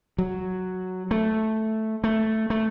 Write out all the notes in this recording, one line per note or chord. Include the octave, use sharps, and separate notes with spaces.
F#3
A3
A3
A3